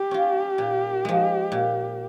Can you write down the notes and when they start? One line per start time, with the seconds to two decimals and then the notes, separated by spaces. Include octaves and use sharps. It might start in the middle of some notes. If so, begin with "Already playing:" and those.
Already playing: G4
0.11 C#4 F4
0.58 A#2
1.05 F3 G#3
1.52 A#2